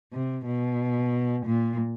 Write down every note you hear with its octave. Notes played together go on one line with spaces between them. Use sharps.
C3
B2
A#2